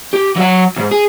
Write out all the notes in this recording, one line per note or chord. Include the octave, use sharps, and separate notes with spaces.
G4
F#3 F#5
D#2 G#2
G#4